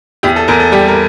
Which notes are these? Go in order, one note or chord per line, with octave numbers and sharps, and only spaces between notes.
E2 G4
A4
E2 A#4
A4
G3 G4
A#4